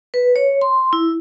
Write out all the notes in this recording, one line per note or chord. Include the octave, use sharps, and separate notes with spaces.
B4
C#5
C6
E4